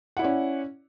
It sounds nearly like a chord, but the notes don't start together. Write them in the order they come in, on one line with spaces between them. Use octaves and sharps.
F#5 E4 D5 C#4